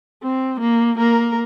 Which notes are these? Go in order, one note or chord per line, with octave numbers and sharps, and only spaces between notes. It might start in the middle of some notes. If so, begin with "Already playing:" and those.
C4
A#3
A#3 A#4